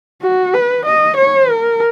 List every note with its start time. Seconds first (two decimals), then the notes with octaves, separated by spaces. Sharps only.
0.22 F#4
0.54 B4
0.86 D#5
1.17 C#5
1.49 A#4